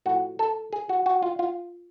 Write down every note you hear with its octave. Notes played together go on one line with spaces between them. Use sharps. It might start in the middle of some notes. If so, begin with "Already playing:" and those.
A2 F3 F#4
A4
G#4
F#4
F#4
F4
F4